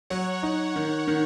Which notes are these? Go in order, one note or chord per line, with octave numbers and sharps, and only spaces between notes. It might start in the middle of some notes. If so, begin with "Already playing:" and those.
F#3 C#5 F#5
D#4
D#3
D#3